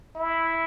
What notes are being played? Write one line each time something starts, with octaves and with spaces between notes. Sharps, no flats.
E4